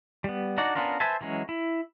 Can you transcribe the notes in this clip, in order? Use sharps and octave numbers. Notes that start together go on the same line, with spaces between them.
G3 B3
D4 D#4 F#4 D5 F#5
B3 C#4 D4 F4 A#4
B4 C5 E5 G#5 A5
E3 F#3 G#3 C#4
E4